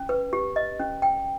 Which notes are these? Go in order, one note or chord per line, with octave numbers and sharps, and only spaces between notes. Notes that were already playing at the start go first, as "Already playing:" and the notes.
Already playing: C#4
B4
G4
D#5
C#4
G5